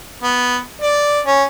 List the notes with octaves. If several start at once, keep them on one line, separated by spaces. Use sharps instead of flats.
B3
D5
C#4